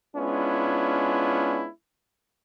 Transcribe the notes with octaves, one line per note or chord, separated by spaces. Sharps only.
G#3 B3 C#4 D4 E4 F4